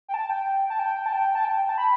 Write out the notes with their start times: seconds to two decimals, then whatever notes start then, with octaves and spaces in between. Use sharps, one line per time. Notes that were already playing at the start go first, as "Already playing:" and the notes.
0.09 G5
0.14 A5
0.29 G5
0.70 A5
0.79 G5
1.06 A5
1.13 G5
1.35 A5
1.45 G5
1.69 A5
1.78 B5